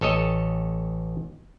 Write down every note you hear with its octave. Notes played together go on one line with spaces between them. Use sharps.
A1 A4 C#5 D#5